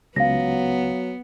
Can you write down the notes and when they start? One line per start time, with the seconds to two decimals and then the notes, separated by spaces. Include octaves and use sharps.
0.16 C#2 F#3 B3 F5 A#6